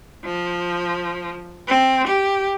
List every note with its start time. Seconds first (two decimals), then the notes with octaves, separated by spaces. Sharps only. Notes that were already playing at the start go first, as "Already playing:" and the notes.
0.25 F3
1.68 C4
2.07 G4